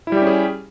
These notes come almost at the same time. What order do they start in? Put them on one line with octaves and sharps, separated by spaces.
E4 G3 G4 C#4 G#4